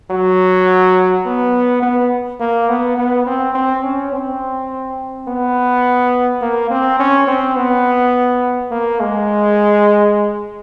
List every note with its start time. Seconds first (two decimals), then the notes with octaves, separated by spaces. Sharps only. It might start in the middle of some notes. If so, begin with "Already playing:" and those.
0.11 F#3
1.26 B3
1.83 B3
2.40 A#3
2.69 B3
2.98 B3
3.27 C4
3.55 C4
3.84 C#4
4.13 C4
5.28 B3
6.42 A#3
6.70 C4
7.00 C#4
7.28 C4
7.56 B3
8.71 A#3
9.00 G#3